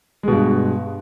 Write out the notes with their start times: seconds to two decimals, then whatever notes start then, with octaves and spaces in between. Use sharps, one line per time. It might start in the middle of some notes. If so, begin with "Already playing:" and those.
0.23 G#3
0.28 B2
0.32 G2